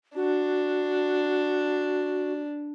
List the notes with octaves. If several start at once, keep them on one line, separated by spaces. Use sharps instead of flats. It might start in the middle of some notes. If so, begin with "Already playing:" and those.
D4 F#4